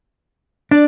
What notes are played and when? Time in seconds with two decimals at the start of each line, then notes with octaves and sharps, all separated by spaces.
0.71 D4 D5